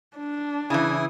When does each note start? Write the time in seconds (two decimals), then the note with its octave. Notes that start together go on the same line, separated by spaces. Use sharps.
0.17 D4
0.70 C#3 E3 E4 G#5 D#6